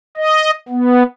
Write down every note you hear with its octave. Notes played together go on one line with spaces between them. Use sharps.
D#5
B3